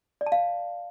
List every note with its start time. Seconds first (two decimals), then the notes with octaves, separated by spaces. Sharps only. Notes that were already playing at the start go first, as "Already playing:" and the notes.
0.21 D5
0.26 A5
0.32 F5